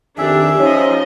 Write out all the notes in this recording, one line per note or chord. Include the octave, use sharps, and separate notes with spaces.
F2 D#3 D4 G4 G#4 E5
F3 C#4 D#4 C#5 D#5